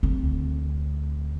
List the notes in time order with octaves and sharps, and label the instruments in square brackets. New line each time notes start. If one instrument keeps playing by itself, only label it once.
[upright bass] D2 C4